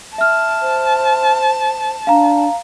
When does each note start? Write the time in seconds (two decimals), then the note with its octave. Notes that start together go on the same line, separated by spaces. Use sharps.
0.18 E5 A5 F6
0.61 C5
2.07 D4 F5 A#5